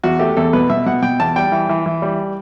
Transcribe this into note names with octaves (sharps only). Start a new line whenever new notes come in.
E2 F#4
A3 G4
E2 A4
B2 B4
B2 E5
B2 F#5
B2 G5
E2 A5
G3 G5
E3
E3
E3
G3